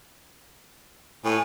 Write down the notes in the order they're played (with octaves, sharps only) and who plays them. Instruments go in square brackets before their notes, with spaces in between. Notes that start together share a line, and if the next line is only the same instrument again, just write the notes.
[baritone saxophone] A2 [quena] G#5